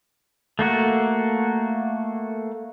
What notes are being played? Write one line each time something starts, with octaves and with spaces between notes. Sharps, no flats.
A3 A#3 F#4